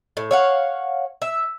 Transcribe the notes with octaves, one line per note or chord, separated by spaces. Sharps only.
A2
C#5 F5 F#5
E5